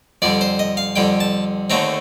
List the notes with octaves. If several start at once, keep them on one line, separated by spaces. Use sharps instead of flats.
F2 D3 G3 D5
C5
D#5
F5
F2 D3 G3 G5
A5
D#2 D3 A3 C4 A#5